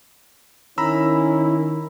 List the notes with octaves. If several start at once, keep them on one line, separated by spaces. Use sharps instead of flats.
D#3 C#4 E4 A#5 B5 E6